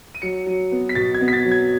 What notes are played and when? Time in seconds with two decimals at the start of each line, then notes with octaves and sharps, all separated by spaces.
0.15 D#7
0.22 F#3 C#7
0.46 F#3
0.72 B3
0.89 B6
0.95 B2 A6
1.14 G#6
1.21 B3
1.28 B6
1.33 A6
1.45 F#3
1.52 G#6